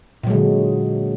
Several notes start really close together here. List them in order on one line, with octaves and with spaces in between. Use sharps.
A#2 F#3 G#3 D3